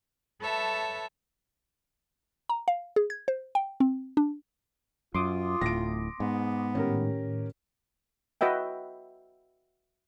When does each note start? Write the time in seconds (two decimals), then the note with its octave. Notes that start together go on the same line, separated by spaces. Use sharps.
0.41 A4 B4 C#5 E5 A5
2.49 A#5
2.68 F5
2.96 G#4
3.10 G#6
3.28 C5
3.55 G5
3.80 C4
4.17 D4
5.15 F#2 F4 C6 D6 D#6
5.61 D1 A2 A#6 D7
6.20 G#2 B3
6.75 A2 D#3 C#4 G4 A#4
8.41 F#4 B4 D#5 E5 G5